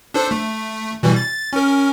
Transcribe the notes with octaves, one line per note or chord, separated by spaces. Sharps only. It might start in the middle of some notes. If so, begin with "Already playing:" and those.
D4 A4 C5
A3
B2 E3 G3
A6
C#4 A#4